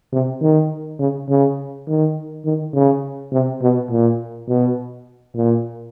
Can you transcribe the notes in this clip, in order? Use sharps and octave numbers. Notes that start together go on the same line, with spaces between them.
C3
D#3
C#3
C#3
D#3
D#3
C#3
C3
B2
A#2
B2
A#2